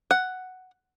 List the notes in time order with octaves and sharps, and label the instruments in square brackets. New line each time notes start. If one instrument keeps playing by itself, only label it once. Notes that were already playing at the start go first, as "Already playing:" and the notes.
[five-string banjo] F#5